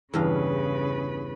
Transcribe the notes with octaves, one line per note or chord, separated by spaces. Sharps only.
E2 G2 C#3 B4 F5